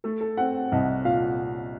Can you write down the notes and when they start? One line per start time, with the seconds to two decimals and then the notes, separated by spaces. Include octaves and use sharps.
0.04 A3 A4
0.21 A4
0.37 C4 F#5
0.72 C2 D#5
1.05 A#2 F5